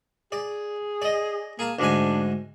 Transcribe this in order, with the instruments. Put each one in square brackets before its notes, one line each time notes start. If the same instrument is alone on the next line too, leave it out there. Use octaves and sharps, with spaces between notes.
[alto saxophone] G#4 [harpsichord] D5
[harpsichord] D5 D#5
[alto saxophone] A#3 [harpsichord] G#4 A5
[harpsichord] D2 G#2 G#5 [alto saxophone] D4